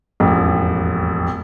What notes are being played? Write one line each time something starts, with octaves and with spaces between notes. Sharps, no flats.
E1 A1 F2